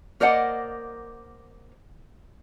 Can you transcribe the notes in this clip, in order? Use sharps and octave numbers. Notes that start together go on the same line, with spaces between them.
A#3 A#4 C5 D5 D#5 F#5